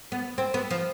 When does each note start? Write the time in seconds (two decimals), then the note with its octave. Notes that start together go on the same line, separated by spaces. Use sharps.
0.12 B3
0.38 C4
0.54 B3
0.71 F3